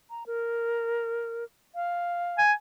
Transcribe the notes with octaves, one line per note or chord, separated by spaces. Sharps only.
A#5
A#4
F5
G#5